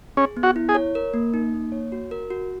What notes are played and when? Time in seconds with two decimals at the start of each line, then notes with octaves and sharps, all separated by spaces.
0.17 C#4 G#4
0.37 B3
0.43 F#4
0.56 E4
0.69 G#4
0.75 C#5
0.95 A#4
1.14 A#3
1.34 D#4
1.53 A#3
1.72 C#5
1.92 F#4
2.11 A#4
2.30 F#4